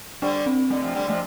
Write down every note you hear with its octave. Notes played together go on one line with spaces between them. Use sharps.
D3 G3 D4
C4
D3 A3
C3 F3
D3 G3
C3 F3 A3